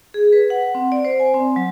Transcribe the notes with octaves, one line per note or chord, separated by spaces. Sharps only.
G#4
B4
F#5
C4
D5
C5
G#5
C4
F#3